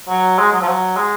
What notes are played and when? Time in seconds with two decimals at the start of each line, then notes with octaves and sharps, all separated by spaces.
0.09 F#3
0.39 G#3
0.52 F#3
0.62 F3
0.68 F#3
0.97 G#3